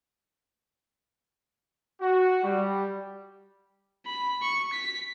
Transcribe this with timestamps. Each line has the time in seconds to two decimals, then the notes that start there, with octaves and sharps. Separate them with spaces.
2.01 F#4
2.44 G3
4.06 B5
4.42 C#6
4.73 B6